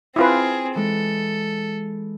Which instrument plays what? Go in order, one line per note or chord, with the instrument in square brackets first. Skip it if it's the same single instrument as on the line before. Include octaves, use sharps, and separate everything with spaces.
[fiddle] C4 G#4 [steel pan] E4 F4 B4
[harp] E3 G#3 [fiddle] A4